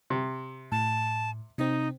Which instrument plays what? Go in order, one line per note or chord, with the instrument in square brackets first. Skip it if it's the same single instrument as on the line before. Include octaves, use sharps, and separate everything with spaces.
[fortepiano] C3
[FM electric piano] A2 [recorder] A5
[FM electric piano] C3 C4 [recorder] D#4